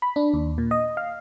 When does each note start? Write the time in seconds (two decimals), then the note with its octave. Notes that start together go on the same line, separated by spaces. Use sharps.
0.02 B5
0.16 D4
0.34 D#2
0.58 A#2
0.71 D#5
0.97 F5